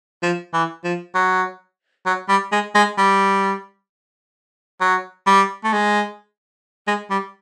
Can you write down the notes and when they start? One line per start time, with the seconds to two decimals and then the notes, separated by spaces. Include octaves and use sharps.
0.23 F3
0.54 E3
0.84 F3
1.15 F#3
2.06 F#3
2.29 G3
2.52 G#3
2.75 G#3
2.98 G3
4.81 F#3
5.27 G3
5.64 A3
5.73 G#3
6.87 G#3
7.10 G3